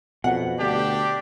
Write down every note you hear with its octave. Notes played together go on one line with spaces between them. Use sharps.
F2 B2 F#5
D2 D4 G4